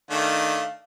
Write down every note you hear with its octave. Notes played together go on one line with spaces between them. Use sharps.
D#3 A3 D4 F5